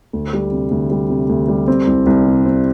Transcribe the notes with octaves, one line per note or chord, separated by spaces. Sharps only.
D2
G3
C3
D2
G3
C3
D2
G3
C4
C2
C2
C3
C4